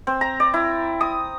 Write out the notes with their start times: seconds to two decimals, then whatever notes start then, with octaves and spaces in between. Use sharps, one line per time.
0.07 C4
0.21 A#5
0.40 D5
0.54 E4
1.01 D#6